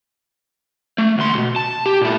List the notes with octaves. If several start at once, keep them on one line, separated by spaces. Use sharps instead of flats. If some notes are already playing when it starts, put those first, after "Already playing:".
A3
D2 C6
C2 B2
A5
G4
A#2 E4